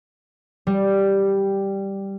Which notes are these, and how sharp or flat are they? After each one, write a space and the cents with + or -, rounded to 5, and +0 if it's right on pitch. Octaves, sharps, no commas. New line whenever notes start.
G3 +0